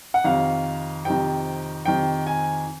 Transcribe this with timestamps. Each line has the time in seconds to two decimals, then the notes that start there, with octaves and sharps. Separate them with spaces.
0.14 F#5
0.24 F2 C3 D#3 F5
1.05 F2 C3 D#3 G5
1.86 F2 C3 D#3 G5
2.27 G#5